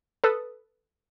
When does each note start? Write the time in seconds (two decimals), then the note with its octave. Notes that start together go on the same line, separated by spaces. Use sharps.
0.24 A4 B4 D#6